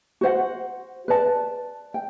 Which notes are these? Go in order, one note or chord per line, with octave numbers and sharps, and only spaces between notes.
F#4 C5 F#5
B4 D5 A5
G5